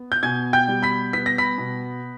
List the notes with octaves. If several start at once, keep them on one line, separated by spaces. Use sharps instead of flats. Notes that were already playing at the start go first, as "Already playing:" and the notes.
Already playing: B3
G6
B2 G#5 G#6
G5 G6
G3
B5 B6
B3 B6
A#6
B5 B6
B2